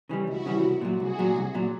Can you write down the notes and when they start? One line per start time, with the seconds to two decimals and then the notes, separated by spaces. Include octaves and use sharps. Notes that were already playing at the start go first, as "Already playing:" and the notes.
0.09 C#3 E3 G3
0.27 C#2 E4 F#4
0.46 C#3 E3 G3
0.63 C2
0.81 A#2 F#3
1.00 C2 F#4 G#4
1.19 A#2 F#3
1.36 C2
1.55 A#2 F#3